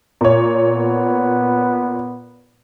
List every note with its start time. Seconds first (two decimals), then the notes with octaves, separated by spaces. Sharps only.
0.21 A#2 C#5
0.63 B3